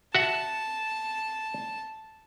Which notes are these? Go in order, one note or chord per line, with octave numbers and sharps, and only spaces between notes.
F#4 E5 F#5 A5